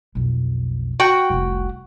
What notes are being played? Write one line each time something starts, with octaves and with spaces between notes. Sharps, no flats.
B1 F2
F#4 G5
F1 C2